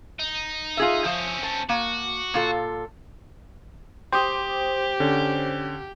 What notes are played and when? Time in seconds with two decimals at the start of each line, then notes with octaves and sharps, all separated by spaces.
0.19 D#4
0.77 F4 G#4 E5
1.05 F3 C4 C#4
1.43 A5
1.69 A#3 F#4
2.34 A#2 F4 A4
4.12 G4 C5 G5 D6 D#6
5.00 D3 C#4